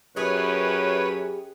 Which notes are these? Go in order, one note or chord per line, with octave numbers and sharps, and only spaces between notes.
F#2 G4 G#4 B4 C#5